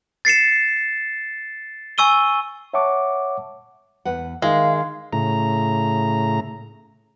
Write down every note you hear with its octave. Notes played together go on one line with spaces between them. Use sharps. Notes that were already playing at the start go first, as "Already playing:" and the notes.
A6 C7 C#7 E7
G#5 C#6 E6 D#7 G7
C#5 E5 F#5 A5 C#6 D6
E2 B4 F#5
D#3 G#3 E5 F5
A2 C#3 A#5